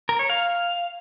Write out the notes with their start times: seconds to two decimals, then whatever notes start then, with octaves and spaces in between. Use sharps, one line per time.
0.09 A#4
0.19 C#5
0.30 F5